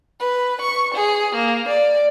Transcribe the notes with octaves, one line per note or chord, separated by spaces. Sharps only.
B4
C#6
G#4
A#3
D5